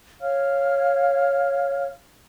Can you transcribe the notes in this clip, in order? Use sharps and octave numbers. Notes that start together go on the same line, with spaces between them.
C#5 F5 F6